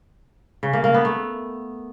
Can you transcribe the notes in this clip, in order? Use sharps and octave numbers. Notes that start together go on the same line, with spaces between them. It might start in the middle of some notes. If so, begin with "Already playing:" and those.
C#3
A#3
A#3
B3
A3